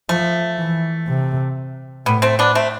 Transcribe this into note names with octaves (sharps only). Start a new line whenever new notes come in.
F3 A3
E3
C3
A2 G3 B3
A3 C4
B3 D4
A3 C4